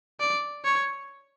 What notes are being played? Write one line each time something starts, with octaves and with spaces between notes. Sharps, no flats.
D5
C#5